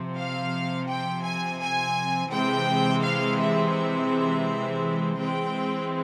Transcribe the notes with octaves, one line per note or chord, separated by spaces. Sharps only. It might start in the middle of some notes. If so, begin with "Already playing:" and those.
Already playing: C3 F3 C4
F5
G5
G#5
G#5
C3 E3 G#3 C4 G5
F5
E5
E5
E3 G#3 C4 G5